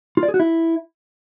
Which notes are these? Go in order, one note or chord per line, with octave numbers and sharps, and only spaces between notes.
F4
D5
G#4
F#4
E4